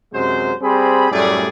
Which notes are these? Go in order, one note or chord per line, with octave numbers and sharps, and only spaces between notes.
F#2 C3 F#3 G#3 C5
G3 C4 G#4 C5 B5
F#2 A2 G3 A3 G#4 D5